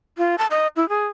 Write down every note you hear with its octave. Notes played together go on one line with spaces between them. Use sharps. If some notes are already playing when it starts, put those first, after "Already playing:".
F4
A5
D#5
E4
G#4